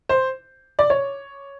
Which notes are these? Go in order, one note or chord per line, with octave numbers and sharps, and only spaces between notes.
C5
D5
C#5